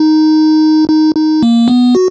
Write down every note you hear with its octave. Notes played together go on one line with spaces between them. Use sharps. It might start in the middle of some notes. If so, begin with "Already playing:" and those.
Already playing: D#4
D#4
D#4
A#3
B3
F#4